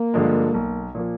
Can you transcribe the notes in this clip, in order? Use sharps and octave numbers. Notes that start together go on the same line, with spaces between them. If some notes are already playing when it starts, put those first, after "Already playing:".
Already playing: A#3
G2 D3 F3 G#3
B1
A#2 F3 A#3